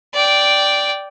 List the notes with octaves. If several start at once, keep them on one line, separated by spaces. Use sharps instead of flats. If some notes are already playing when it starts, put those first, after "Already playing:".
D5 G5